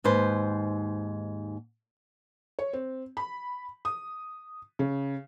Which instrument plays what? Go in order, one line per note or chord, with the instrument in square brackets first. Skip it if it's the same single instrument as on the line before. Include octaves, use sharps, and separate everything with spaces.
[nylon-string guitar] D#2 G#2 B4 C5
[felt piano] C#5
C4
B5
D#6
C#3